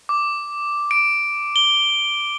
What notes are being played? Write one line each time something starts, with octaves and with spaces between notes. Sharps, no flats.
D6
D7
G7